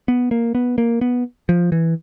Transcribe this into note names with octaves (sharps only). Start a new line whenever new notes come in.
B3
A#3
B3
A#3
B3
F3
E3